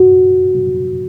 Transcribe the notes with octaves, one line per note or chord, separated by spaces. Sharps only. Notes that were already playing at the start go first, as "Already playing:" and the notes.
Already playing: F#4